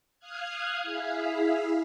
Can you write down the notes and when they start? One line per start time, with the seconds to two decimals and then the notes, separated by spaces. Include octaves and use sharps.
0.19 F5 D#6 F6 F#6 G#6
0.82 E4 G#4 E5 F5